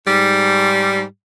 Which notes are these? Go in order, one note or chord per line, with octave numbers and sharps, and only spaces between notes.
G#2 G3